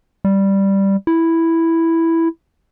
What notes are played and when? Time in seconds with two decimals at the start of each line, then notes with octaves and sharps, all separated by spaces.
0.25 G3
1.07 E4